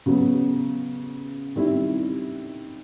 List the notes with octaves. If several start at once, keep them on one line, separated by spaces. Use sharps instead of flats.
C#3 F#3 B3
D#3 G3 C4 E4